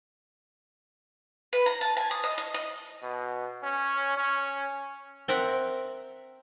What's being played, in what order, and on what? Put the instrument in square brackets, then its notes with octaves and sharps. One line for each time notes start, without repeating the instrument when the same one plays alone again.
[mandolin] B4
A#5
A5
G#5
D#6
D#5
D#5
D#5
[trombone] B2
C#4
C#4
[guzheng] C4 A#4 E5 F#5